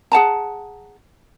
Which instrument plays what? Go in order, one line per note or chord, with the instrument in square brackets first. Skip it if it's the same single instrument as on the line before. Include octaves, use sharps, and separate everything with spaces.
[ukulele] G#4 F#5 A5 A#5